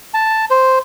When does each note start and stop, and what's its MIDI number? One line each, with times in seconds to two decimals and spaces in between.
0.14 0.45 81
0.50 0.79 72